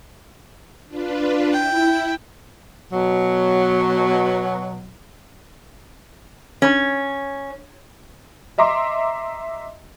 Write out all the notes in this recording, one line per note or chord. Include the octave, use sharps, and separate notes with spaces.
D4 F4 B4
E4 G5
B2 F#3
C#4
D#5 E5 A#5 C6 D6